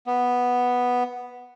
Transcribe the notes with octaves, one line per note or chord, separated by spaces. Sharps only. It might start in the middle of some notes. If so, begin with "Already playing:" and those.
B3